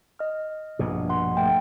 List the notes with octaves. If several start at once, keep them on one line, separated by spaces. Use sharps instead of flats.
D#5 F6
A#1 G2 B2
F#5 C6
A3 G5